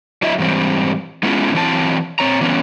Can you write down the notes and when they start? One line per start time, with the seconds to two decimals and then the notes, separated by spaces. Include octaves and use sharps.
0.22 F#3 E4 D#5 E5
0.38 G#2 E3 G3 C4
1.23 G#3 B3 C#4 E4 F4 G#4
1.54 E3 F#3 C4 E4 G#5 A5
2.19 C4 C#5 A#5
2.41 E3 B3 C#4